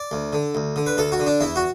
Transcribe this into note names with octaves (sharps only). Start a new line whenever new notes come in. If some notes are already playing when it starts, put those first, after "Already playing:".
Already playing: D5
D2
D3
D2
D3
B4
D2 A4
F#4
D3
D4
E2 E4
F#4